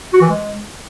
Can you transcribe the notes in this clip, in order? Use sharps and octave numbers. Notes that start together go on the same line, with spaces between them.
F#4
E3
G#3